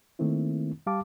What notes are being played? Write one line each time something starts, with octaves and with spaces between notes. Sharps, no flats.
D#3 A3 A#3 C4 E4
G3 G4 F5 A5 D6